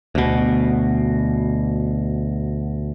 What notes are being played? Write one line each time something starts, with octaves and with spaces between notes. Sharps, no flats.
D2 B2